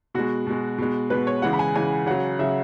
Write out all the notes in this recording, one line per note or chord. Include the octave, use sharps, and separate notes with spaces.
B2 G#3 F#4
B2 G#3
B2 G#3
B2 G#3 B4
C#5
C#3 E3 G#3 F#5
B5
G#5
C#3 E3 G#3 G#5
C#3 F#3 F#5
C#3 F#3 E5